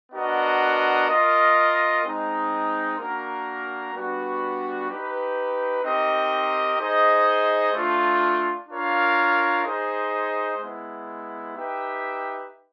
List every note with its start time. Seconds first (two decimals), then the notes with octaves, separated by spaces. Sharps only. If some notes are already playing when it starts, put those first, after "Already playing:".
0.12 B3 D4 F#4 A#4 D#5
1.08 F4 A#4 D#5
2.04 G#3 C4 D#4
2.98 A#3 D4 F#4 A#4
3.93 G3 B3 D4 F#4 B4
4.89 D#4 G4 B4
5.83 C4 D#4 G4 A#4 D#5
6.79 D#4 G#4 C5 D#5
7.73 A3 D4 F4
8.68 D4 F4 A#4 C#5 F5
9.64 D#4 G#4 C5 D#5
10.58 G#3 B3 E4
11.54 D#4 G4 B4 E5 G5